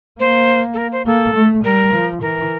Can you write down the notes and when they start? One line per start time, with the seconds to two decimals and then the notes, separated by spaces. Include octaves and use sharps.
0.20 A#3 C5
0.74 A4
0.77 A#4
0.92 C5
1.06 A#3 A4
1.35 A3
1.64 G3 A#4
1.93 F3
2.21 E3 A#4